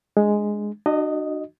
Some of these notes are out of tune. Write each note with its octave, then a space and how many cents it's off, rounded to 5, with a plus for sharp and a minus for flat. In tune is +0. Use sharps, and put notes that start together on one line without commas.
G#3 +0 D4 +0
D4 +40 F#4 +0 D#5 +0